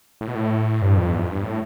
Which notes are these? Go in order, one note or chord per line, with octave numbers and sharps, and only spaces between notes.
A2
B2
A2
G2
F2
E2
F2
G2
A2